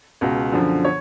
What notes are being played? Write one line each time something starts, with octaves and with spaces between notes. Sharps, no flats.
C#2 B2
F#2 D3 F3
C#5